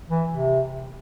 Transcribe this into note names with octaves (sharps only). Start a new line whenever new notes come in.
E3
C3